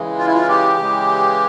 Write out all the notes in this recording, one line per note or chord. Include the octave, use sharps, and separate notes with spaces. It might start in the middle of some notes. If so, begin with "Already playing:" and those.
Already playing: C#3 E3 G#3
F4
E4
F4
G4
C#3 E3 G#3